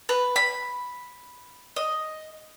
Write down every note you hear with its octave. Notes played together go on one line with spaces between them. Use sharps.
B4
B5
D#5